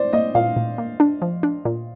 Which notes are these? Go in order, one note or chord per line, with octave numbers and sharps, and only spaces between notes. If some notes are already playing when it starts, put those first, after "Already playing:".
Already playing: C5 D5
A#3 D#5
A#2 F5
A#2
A#3
D4
F3
D4
A#2